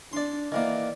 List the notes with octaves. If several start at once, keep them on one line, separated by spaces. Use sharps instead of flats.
D4 D5 C6
D#3 E3 A#3 D5